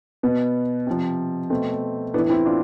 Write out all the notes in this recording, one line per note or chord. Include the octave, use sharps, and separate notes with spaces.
B2 B3
C3 F3
B2 A3 C4
A2 E3 B3 D4
C4 E4
D4 F4